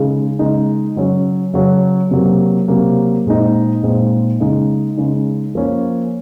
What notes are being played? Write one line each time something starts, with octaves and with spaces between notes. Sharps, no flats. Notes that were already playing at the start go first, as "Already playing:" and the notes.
Already playing: C#3 G#3 D#4
C#3 G#3 D#4
C#3 F#3 C#4
C#3 F#3 C#4
C3 F#3 A#3
C3 F#3 A#3
A#2 G#3 C4 D#4
A#2 G#3 C4 D#4
C#3 G#3 D#4
C#3 G#3 D#4
F3 A#3 C#4